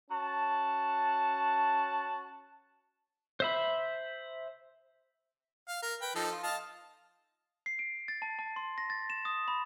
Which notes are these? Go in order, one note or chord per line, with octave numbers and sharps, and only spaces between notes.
C#4 F#4 A5
C5 E5 B5
F5
A#4
B4 G5
F3 D#4 A4
F4
D#5 F5 A5
C7
D7
A6
A5
A5
C6
A#6
A6
E7
D#6
B5